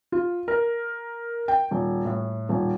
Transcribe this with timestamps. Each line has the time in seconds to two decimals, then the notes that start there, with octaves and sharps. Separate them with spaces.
0.12 F4
0.48 A#4
1.48 G5
1.71 D#1
2.05 A2
2.49 D#1